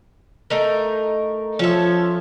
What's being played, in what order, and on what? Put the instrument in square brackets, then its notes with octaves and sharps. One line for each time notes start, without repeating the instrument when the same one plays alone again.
[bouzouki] A3 D#4 A#4
[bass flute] F3 [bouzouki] C#4 A4 E5